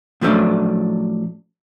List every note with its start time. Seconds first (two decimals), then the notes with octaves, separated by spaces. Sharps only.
0.21 A2 F3 F#3 A3 C#4 D4